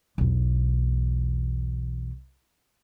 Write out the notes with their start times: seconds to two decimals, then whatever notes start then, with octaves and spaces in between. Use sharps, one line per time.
0.18 B1 E2